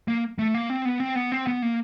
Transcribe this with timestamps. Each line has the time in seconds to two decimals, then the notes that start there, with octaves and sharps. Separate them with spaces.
0.08 A#3
0.39 A3
0.54 A#3
0.70 C4
0.85 B3
1.00 C4
1.15 B3
1.32 C4
1.47 B3
1.62 A#3